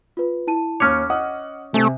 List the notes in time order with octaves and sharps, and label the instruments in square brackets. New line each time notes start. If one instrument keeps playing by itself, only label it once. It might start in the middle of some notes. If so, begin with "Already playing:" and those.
[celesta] F4 B4
E4 A5 D#7
[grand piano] D#2 F#6 [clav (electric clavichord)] C#4 C#5 [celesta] D6 F6
[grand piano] D#5 F#5 D#6
[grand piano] C3 G#5 [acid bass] A3